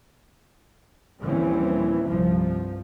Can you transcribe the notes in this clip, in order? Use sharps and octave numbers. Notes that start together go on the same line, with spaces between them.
A#1 D#2 E3 G3 C4 C#4
C2 G2 F3